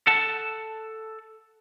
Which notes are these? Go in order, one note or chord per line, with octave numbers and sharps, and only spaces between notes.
A4 F#5 A5